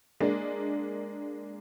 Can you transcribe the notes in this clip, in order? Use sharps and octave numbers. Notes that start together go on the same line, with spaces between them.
G#3 A#3 D4